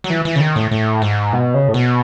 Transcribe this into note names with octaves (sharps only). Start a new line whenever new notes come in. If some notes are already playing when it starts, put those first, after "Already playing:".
F#3
E3
E3
C#3
D#3
A2
A2
G#2
B2
C#3
A2
B2